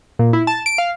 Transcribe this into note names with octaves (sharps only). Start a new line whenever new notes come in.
A#2
E4
A5
D7
F5